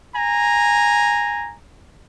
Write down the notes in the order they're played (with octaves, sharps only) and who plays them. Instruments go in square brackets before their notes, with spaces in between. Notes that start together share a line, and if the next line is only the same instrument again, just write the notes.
[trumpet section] G#5 A#5